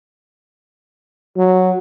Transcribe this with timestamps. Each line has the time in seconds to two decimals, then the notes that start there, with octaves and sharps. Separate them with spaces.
1.37 F#3